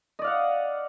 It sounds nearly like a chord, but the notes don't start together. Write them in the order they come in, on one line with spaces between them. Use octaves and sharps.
D#5 D5 F5 F#5